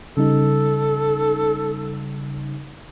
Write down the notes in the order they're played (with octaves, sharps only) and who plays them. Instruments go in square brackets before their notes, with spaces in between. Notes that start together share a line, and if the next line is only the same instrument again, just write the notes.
[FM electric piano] C#3 G3 D#4 [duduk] A4